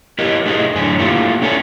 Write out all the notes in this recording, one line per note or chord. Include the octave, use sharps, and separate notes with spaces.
E4 G4 A#4 D#5
A3 D#4 E4 G#4 D#5
F#2 A2 D3 D4 G#5
A3 A#3 E4 F4 G4 A4
B3 C#4 E4 A4 D5 G#5